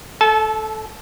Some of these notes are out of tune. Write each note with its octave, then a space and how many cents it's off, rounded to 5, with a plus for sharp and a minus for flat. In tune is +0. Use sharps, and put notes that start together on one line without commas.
A4 -5 A5 -35